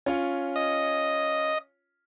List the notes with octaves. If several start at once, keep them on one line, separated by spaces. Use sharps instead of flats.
C#4 F4 C#5
D#5